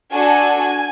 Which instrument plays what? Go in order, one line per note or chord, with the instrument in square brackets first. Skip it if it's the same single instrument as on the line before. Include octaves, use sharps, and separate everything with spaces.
[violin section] D4 F#4 A4 G#5